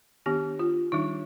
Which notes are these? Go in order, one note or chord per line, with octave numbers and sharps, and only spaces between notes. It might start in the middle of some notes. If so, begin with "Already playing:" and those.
D#3 B3 D4 G4
F4
D#3 G3 D4 D#4